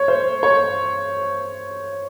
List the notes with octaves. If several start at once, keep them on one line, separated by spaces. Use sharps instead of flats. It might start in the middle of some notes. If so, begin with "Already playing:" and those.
Already playing: C#5
C5
C#5